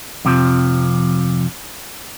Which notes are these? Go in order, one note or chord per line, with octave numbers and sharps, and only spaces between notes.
F2 C3 E3 F3